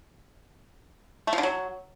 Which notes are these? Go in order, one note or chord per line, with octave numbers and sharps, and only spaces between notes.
A3
F3
D3
F#3